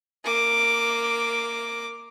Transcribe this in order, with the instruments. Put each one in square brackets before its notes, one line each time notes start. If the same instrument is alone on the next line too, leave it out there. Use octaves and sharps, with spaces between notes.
[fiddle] A#3 D6